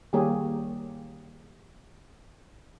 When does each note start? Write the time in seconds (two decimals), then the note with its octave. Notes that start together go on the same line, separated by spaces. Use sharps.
0.13 D#3 G3 A#3 G4 G#4 C#5